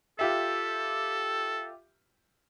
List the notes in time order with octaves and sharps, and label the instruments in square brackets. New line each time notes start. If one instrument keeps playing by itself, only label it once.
[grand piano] F4 G4 E5 [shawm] A4